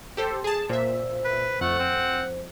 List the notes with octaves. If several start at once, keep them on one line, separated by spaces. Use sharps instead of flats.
G4 A4 C5
G#4 A5
A#2 C5 E5
B4
F2 A3 F#5
C4